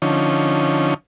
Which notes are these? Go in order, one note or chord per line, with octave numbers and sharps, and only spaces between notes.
D3 F3 C#4 D#4